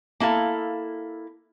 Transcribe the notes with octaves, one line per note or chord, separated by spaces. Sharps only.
A#3 E4 A4 F5